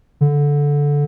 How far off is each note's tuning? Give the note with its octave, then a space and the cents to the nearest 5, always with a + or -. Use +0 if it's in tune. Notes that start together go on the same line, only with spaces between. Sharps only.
D3 -15